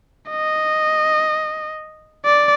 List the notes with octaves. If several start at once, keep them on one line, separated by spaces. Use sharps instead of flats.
D#5
D5